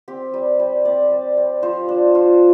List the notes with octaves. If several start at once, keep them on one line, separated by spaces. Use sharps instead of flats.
C4 G4
G3
G3
C4 D5
G3
G3
F3 C5
D4
F4